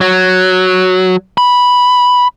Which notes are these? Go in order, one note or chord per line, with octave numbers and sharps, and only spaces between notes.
F#3
B5